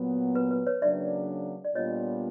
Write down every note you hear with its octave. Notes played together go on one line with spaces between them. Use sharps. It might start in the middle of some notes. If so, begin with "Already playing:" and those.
Already playing: A#2 F#3 B3
B4
B4
B4 C#5
C#3 F#3 A#3 D4 D5 E5
D5
A#2 G3 B3 D4 F4 C#5 D#5